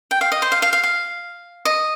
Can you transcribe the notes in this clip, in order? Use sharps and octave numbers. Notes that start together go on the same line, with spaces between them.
G5
F5
D#5
C5
F5
F5
F5
F5
D#5